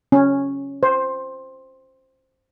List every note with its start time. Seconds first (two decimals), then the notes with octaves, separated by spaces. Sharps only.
0.12 C#4
0.83 C5